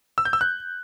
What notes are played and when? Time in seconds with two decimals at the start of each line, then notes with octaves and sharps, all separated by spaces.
0.18 E6
0.25 G6
0.33 E6
0.41 F#6